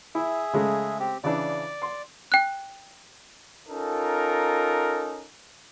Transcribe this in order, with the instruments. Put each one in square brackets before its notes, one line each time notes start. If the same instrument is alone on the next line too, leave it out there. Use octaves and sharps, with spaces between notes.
[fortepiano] E4 [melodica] G#4 E5
[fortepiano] C#3 G#3 A3
[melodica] C4 G4
[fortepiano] C#3 E3 D4 [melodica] D5
[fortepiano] C6
[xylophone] G5 F#6
[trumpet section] C#4 D#4 F4 A4 A#4